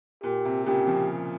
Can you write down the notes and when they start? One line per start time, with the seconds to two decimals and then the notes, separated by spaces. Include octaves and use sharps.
0.23 A#2 G4
0.45 C3
0.66 A#2 C#3 G4
0.87 C#3 F3